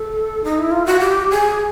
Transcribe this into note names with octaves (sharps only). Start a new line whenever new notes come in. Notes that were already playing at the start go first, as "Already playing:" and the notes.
Already playing: A4
D#4
E4
F4
F#4
G4
G#4